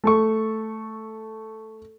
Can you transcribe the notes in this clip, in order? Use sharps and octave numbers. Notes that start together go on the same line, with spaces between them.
A3 A4 C#6